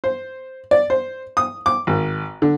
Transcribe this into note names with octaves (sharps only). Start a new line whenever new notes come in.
C5
D5
C5
D#6
D6
G#1
D3